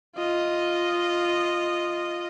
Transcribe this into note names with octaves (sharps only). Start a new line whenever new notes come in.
F4 D#5